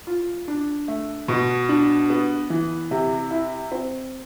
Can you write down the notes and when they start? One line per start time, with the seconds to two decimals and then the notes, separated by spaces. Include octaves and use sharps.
0.07 F4
0.48 D4
0.88 A3
1.28 B2
1.69 D4
2.10 B3
2.50 E3
2.91 C3
3.31 E4
3.72 C4